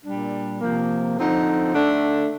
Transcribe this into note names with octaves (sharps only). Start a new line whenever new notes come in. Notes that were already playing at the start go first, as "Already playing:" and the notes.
A#2 G3 D4
C3 F3 A#3
D3 F3 C4 D#4
D3 A3 D4